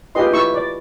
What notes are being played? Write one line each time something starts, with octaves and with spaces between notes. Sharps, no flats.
F4 G4 G#4 B4 D#5 C6
E4 B4 C#6 E6
D5